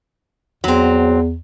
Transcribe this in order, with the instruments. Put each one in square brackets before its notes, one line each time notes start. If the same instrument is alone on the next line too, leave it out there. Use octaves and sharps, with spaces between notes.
[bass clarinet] E2 [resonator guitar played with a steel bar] F#3 C4